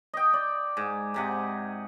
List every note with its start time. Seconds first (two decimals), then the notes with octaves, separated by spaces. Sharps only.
0.14 D#5 G5
0.34 D5
0.77 G#2
1.14 G#2 C3 F#5